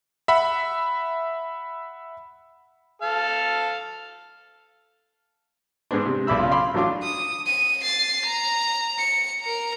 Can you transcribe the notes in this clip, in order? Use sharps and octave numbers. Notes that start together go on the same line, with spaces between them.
E5 F#5 B5
A4 F5
G#2 G#3 B3 C4 D4
C3
B1 D5 E5 B5 E6
C#3 F4
F5 B5 C6 D6
A1 F#3 D4 F4 D6
D#6
D#7
A6 C7
A#5
C#7
A#4 A#5